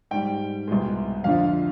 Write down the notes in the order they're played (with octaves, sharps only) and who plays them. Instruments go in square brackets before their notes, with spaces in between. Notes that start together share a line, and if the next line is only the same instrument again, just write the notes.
[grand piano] G#2 G3 G5
C2 B2 G#3
F2 D3 F3 F5